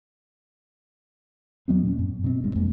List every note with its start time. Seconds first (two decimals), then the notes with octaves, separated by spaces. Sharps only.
1.68 E2 F#3 B3 C4
1.83 A#2 A#3 C#4
1.99 F#2
2.24 B2 C4
2.43 E1 G2 G#3
2.56 F2 G#3 A#3